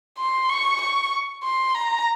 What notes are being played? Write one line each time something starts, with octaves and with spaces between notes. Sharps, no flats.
C6
C#6
C#6
C6
A#5